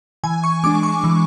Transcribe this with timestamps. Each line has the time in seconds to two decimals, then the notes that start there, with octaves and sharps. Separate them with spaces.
0.24 E3 G#5
0.44 C#6
0.64 G#3 D4 D6
0.83 C#6
1.04 E3